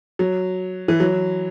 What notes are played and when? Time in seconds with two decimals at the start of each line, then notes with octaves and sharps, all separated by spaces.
0.19 F#3
0.88 E3
1.00 F#3